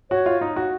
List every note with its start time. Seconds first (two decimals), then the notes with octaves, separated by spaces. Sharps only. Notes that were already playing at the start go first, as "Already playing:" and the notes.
0.11 F#4 C#5
0.26 F4
0.41 D#4
0.56 F#4